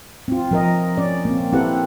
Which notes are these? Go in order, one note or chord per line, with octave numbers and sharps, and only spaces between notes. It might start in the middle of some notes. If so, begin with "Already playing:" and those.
C4 F4
F3 A#4 D#5
C#4 D5
A#3 C4
C4 E4 G4 A4 B4 F#5